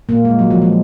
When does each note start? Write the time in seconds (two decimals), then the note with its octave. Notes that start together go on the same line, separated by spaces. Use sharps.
0.09 A#2 A#3
0.25 G#3
0.39 F#3
0.50 F3
0.62 G#3